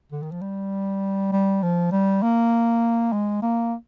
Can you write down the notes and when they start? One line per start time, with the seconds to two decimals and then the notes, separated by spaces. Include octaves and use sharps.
0.12 D3
0.22 D#3
0.31 F3
0.41 G3
1.32 G3
1.62 F3
1.91 G3
2.22 A#3
3.12 G#3
3.42 A#3